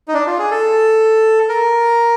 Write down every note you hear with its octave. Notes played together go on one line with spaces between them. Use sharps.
D#4
D4
F4
G#4
A4
A#4